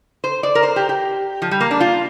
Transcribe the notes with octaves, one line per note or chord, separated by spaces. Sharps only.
C5
D5
A#4
C5
G4
G4
F3
G3
A#3
D4
F4